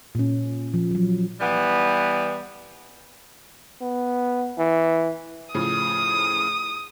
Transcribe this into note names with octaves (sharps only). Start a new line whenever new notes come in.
A#2 C#4
F3
F3 F#3
E3 G3 B3
B3
E3
A2 C#3 F3 D#6